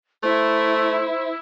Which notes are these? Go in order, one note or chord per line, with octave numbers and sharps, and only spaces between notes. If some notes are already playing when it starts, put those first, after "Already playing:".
A3 E4 C5